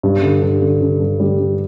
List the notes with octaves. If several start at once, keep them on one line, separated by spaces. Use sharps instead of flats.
G2
D3
G2
D3
D3
G2
D3 G3
D3